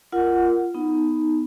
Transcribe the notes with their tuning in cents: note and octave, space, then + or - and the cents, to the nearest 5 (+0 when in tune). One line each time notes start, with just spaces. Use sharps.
F4 -15 A#4 +0 F#5 -5
B3 +0 D#4 +0